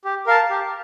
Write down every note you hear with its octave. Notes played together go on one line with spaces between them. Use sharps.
G4
A#4 F5 A5
G4